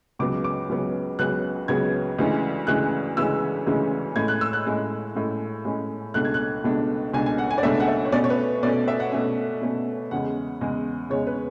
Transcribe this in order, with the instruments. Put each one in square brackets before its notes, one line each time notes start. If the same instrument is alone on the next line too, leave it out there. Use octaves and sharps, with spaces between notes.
[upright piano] C#2 C#3 F#3 B3 D6
D6
C#2 C#3 F#3 B3
C#2 C#3 F#3 B3 F#6
C#2 C#3 F#3 B3 G#6
D2 C#3 E3 G#3 C#4
D2 C#3 E3 G#3 C#4 F#6
D2 C#3 E3 G#3 C#4 E6
D2 C#3 E3 G#3 C#4
A2 G#3 C#4 G#6
F#6
E6
F#6
A2 G#3 C#4
A2 G#3 C#4
A2 G#3 C#4
C#2 B2 A3 D4 F#6
G#6
F#6
C#2 B2 A3 D4
C#2 B2 A3 D4 G#5
G#5
F#5
G#5
D5
C#2 B2 A3 D4 E5
F#5
E5
C#5
B2 A3 C#4 D5
C#5
B4
B2 A3 C#4 D5
E5
F#5
B2 A3 C#4
B2 A3 C#4
E2 C#3 G#3 F#5
E2 C#3 G#3
E2 C#3 G#3 C#5
B4